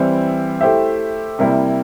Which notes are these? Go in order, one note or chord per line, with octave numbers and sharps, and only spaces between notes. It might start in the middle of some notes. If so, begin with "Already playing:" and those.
Already playing: E3 G3 C4 E4
A3 E4 G4 C5 E5
C3 G3 A#3 E4